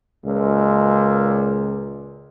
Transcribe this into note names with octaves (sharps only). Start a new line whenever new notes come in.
C#2 A#2 G#3